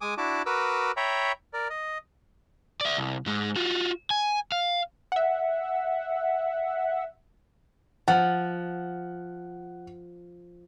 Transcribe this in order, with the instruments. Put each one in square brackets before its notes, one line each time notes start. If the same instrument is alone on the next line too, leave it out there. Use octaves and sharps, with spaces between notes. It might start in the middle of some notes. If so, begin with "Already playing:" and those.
[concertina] G#3 G#5 D6 D#6
D4 E4 F#4 A5 D6
F#4 A#4 B4 D6 E6
C#5 E5 G5 A#5 B5 C#6
A#4 D5
D#5
[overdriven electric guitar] D5 E5
C2
G#2 G#3
F4 F#4
G#5
F5
[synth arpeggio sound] E5 F#5
[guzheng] F3 [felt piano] F#5